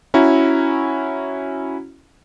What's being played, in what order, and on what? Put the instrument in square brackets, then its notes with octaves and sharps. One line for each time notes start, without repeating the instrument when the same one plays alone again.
[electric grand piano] C#4 E4 F#4 A#5